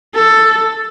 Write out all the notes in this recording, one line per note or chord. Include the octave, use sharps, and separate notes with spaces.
A4